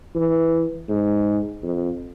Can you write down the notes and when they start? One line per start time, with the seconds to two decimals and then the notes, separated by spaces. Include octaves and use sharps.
0.15 E3
0.89 G#2
1.63 F2